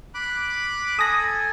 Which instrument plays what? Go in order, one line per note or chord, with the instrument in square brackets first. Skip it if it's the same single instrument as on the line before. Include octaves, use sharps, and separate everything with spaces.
[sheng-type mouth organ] B5 D6 F#6
[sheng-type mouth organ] A4 G#5 [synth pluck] D#6 A#6